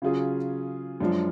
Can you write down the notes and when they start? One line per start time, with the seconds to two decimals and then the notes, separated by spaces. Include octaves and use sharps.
0.02 C#3 F#3 C#4 F4 G#4
1.00 F#2 F3 G#3 D4 F4